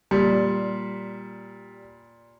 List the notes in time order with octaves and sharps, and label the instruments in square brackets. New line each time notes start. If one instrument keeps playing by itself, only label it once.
[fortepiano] A#2 [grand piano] G3